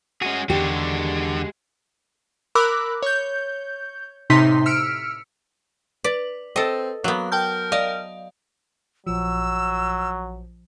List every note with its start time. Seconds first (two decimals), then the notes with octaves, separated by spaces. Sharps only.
0.22 G#3 C#4 F#4 G#4
0.50 E2 D3 D#3 G#3 F#4 G4
2.55 A#4 B5 D6 E6 F#6
3.03 C#5 G6
4.30 A2 C3 D#4 C6 B6
4.66 E6 F6 B6 C#7 D7
6.04 B4 D5
6.56 C4 A4 D#5
7.04 F#3 A#3 B3 F#6
7.32 A#4 G5 A5 G6
7.72 D5 D#5 F5
9.07 A#1 F3 F#3 E6